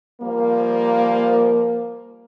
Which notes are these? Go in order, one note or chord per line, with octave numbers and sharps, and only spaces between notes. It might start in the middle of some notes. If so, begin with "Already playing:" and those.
F3 G3 A#3